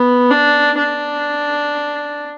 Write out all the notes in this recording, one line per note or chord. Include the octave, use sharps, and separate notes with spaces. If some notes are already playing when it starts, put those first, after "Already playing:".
Already playing: B3
D4
D4